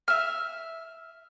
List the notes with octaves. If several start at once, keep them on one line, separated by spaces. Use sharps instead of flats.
E5 F6